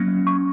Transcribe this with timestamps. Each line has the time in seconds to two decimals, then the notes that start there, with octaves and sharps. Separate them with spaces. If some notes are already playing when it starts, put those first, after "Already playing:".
Already playing: F#3 A#3 C#4
0.27 C#6